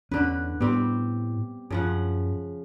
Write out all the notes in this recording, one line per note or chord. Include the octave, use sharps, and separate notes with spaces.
E2 D3 C#4 B4
A2 G3 B3 C4
F#2 C#3 F3 F#5